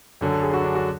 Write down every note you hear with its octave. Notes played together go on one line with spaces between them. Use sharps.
F#2 D3 F#3
A4
G#4
F#4
D4
F#4